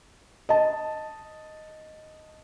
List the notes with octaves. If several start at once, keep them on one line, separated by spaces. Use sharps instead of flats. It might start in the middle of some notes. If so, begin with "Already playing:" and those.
D#5 A5